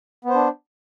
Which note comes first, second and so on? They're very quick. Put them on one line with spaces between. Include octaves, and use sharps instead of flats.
B3 C5 D4